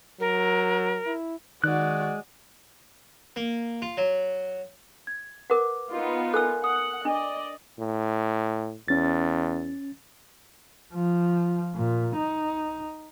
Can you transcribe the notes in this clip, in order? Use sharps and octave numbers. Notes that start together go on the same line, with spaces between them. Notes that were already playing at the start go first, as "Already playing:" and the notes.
F#3 A#4
E4
D#3 G#3 F#4 D5 F#6
A#3
F4
F#3
G#6
A#4 B4 F#5 D6
B3 D#4 F4
A4 A#4 G#5 E6 F#6
F#5 D#6
D4 D5 D#5
A2
E2 C#4 A6
F3
A#2
D#4